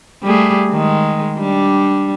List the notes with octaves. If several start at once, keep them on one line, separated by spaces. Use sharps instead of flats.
G3 A3 G#4
D#3 G#3
G3 D4